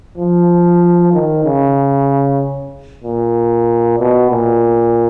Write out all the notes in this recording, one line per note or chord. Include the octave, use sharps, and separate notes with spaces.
F3
D#3
C#3
A#2
B2
A#2